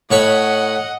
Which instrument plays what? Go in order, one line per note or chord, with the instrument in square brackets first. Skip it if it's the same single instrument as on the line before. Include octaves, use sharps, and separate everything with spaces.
[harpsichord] A2 C#5 B5 [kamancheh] D#5 F#5